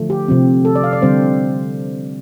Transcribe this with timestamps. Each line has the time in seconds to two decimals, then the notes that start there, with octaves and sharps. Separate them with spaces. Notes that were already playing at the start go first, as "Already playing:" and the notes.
Already playing: D3 F3 A3
0.10 G4
0.28 C3 F3 C4
0.65 A4
0.76 D5
0.84 F5
0.93 D5
1.02 D3 G3 C4 C5